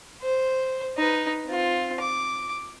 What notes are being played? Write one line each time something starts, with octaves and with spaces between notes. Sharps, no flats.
C5
D#4 B4
C4 F4
D6